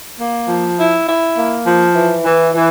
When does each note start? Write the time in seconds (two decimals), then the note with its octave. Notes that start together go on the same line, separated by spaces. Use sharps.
0.18 A#3
0.48 F3
0.77 E4
1.07 E4
1.36 A#3
1.66 F3
1.95 E3
2.25 E3
2.54 E3